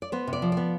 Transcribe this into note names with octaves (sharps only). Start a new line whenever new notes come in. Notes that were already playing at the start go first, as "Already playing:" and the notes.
D5
B3 C5
C3
D5
F3
B3 D5